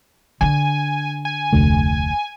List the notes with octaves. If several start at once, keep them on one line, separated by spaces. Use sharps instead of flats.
D3 D4 G#5
G#5
F1 D2 A3